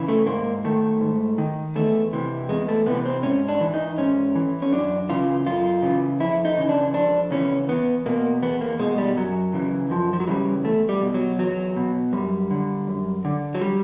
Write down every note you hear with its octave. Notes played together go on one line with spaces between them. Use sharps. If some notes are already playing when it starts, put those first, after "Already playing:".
Already playing: C#3 E3
A3
G#2 A#3
D#3 A3
G#2
D#3
E2 A3
C3 E3
E2 G#3
A3
C3 E3 B3
C4
G#2 C#4
D4
E3
D#4
G#2 C#4
E3
C#4
F#2 D4
C#3 E3 F4
F#2 F4
C#3 E3
F2 E4
D#4
C#3 E3
D4
F2 D4
C#3 E3 C#4
E2 B3
B2 A#3
E2 B3
A#3
B2 G#3
G3
F#2 F#3
C#3 E3
F#2 F3
F3
F#3
C#3 E3 G3
E2 A3
G3
B2
F#3
E2 F#3
B2
F#2 G3
D3
F#2
D3
F#3
G3